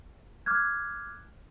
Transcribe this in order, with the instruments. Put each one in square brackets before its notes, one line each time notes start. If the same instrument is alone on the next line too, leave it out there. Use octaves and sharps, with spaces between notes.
[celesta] D6 F6 F#6 G#6